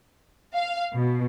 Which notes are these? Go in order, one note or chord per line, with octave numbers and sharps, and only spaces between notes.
F5
B2